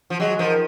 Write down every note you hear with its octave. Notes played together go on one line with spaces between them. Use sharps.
F3
F#3 G#3
D#3 F3